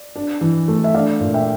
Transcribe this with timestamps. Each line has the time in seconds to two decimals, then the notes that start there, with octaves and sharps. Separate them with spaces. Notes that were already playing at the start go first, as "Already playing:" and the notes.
Already playing: D5
0.16 D4
0.41 E3
0.68 A3
0.84 E5
0.94 D4 D5 F5
1.21 A#2
1.34 E5 G5